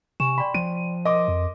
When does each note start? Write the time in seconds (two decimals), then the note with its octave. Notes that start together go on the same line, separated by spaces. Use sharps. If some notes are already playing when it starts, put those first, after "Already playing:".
0.20 C3 G#5 C#6 E7
0.38 D5 G5 B5 C6
0.54 F3 D#7
1.05 A#4 D#5 C6 D6
1.28 F2